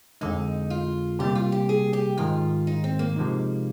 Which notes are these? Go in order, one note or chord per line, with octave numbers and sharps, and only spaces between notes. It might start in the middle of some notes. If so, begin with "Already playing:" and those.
F2 D3 G#3 D#4
F4
C3 G3 A#3 G4
F4
G4
G#4
G4
G#2 D#3 G#3 F4
D#4
C4
A#3
C3 F3 G#3 D#4